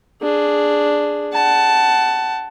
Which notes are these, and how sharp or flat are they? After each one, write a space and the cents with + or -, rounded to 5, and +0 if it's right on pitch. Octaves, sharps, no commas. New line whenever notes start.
D4 +0 G#4 +0
F#5 +20 A5 +0